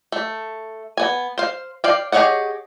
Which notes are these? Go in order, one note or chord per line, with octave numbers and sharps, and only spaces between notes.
A3
B3 G#5
C5 F5
D5 F5 G5
G4 G#4 C#5 D#5 F#5